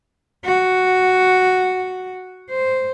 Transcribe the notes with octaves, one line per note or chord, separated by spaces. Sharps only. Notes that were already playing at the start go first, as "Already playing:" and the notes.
F#4
C5